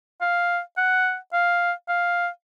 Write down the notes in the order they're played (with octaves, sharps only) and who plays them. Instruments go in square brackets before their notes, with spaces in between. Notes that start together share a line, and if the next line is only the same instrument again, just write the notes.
[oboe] F5
F#5
F5
F5